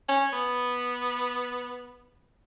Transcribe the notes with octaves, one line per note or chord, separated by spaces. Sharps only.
C#4
B3